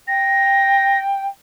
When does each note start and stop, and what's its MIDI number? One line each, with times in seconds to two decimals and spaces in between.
0.07 1.26 79
0.07 0.97 94